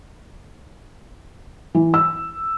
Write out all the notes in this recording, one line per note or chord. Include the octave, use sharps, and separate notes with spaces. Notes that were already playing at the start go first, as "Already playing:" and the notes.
E3
E6